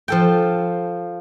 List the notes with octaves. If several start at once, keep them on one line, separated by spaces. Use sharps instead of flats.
F3 A4 G5